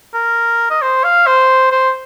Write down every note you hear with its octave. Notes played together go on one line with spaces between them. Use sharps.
A#4
D#5
C5
F5
C5
C5